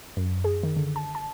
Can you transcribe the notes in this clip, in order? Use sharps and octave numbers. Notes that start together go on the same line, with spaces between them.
F#2
G#4
D#3
D3
A5
A5